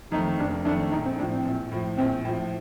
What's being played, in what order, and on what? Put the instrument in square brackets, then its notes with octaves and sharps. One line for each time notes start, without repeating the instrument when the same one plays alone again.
[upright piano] F2 D#3 A3 [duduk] D#4
[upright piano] F1 [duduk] D4
[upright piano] F2 D#3 A3 [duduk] D4
[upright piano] A#1 [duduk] D#4
[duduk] C4
[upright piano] A2 F3 [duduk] D4
[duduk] C4
[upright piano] A#1
A2 F3
[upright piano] A#1 [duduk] C4
[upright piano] A2 F3